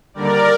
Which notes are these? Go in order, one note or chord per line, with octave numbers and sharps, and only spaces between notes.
D#2 D3 G3 A#4 D5